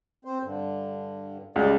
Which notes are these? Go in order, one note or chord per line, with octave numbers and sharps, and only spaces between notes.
C4 C5
G2 D3
C#2 G3 D5 D#5